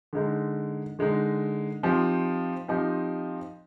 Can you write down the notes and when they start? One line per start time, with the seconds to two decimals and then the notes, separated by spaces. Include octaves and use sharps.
0.13 D3 G#3 D#4
0.99 D3 G#3 D#4
1.83 F3 C4 D#4 G4
2.68 F3 C4 D#4 G4